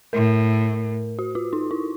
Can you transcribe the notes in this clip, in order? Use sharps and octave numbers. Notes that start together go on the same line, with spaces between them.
A2 A#4
F#4
F4
D#4
E4